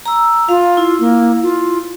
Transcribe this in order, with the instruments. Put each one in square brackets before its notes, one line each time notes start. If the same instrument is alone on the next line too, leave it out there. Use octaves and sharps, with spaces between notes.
[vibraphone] A#5 E6
[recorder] F4 [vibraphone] F5
[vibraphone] E4
[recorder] A#3
F4